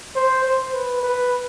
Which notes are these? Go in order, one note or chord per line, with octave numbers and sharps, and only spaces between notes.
C5
C5
B4
B4